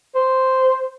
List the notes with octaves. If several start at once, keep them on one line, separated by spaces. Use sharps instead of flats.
C5